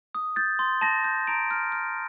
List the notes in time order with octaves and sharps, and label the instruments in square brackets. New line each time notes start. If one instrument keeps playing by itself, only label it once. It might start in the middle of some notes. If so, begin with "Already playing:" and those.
[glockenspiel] D#6
G6 A6
C6
A5 A#6
G6
A#5 D7
F6
F6